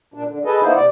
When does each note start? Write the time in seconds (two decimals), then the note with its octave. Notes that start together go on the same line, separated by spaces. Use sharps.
0.14 A#2 D4
0.28 D3
0.45 G#4 A4 B4 D#5
0.62 A#3 B3 D#4 E4 C5
0.76 C3 D5